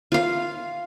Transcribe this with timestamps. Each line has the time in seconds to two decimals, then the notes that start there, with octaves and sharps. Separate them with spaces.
0.12 F4 F5